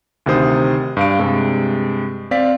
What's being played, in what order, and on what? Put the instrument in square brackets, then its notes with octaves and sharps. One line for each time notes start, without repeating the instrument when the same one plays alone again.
[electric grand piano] D2 C3 D#3 C5 D#6
G2 F5 D7
G2 C3 G#3
C4 D5 F5 B6